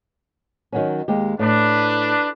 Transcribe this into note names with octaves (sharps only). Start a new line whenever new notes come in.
D#3 F#3 C#4
D#2 G#3 G4
A2 D4 B4